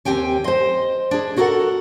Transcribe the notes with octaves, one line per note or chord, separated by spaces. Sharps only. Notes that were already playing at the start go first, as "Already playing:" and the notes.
D#2 C4 G4 G5 G#5
C5 D#5
D4 G#4
E4 F#4 A4 A#4 F#5